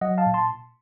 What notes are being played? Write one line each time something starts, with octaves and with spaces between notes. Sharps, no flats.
F#3 D#5 F#5
F5 A5
A#2
A5 C6